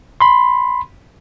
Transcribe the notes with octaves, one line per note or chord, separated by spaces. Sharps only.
B5 C6